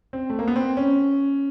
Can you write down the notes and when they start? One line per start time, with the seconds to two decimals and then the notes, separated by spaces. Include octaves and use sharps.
0.13 C4
0.30 A3
0.39 A#3
0.48 B3
0.56 C4
0.77 C#4